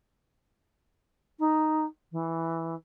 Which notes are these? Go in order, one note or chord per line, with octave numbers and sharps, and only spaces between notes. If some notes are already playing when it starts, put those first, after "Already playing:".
D#4
E3